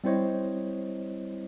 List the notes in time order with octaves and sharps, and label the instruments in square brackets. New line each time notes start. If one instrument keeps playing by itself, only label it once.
[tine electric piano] G3 C4 E4 C5 C#5 D#5